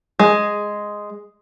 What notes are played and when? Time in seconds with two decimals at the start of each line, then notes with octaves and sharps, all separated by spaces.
0.19 G#3